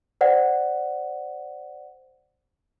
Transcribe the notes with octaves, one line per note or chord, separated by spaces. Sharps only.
C5 D5 F#5